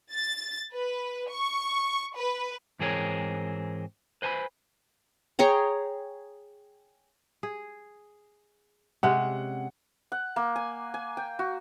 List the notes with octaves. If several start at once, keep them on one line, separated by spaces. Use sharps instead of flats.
A6
B4
C#6
B4
G#2 E3 C4 G#4 A#4 C#5
B4 C5 G#5 A5 B5
G#4 C#5 G5 A#5
G#4
C3 G#3 C#4 F#5
F#5
A#3
G#5
G#5
G5
F#4